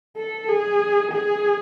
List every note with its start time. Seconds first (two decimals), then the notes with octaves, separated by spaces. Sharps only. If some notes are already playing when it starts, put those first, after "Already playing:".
0.17 A4
0.48 G#4
1.12 G#4